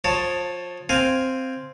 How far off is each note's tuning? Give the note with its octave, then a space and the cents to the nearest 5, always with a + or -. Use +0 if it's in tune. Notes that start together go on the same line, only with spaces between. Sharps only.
F3 +25 C#5 +0 A5 +5
C4 +0 F5 +0 G#5 +0